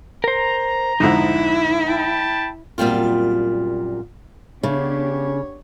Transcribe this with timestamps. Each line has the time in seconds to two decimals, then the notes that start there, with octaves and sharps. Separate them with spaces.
0.24 A#4 C5 A#5
1.00 F2 G#2 D3 D#4 E4
1.87 G5 A5 B5
2.78 F#2 A#2 G3 C4 F4
4.63 C#3 B3 D4 G4 C#5